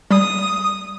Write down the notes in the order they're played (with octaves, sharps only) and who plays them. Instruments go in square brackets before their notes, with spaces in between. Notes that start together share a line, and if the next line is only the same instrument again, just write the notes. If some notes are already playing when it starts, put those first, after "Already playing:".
[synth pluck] G3 [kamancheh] D#6